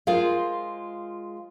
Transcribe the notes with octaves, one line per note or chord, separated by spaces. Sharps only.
G#3 F4 G#4 A#4 C5 F5